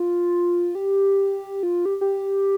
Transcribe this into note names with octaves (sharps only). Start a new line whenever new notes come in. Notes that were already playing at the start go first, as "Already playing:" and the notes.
Already playing: F4
G4
F4
G4
G4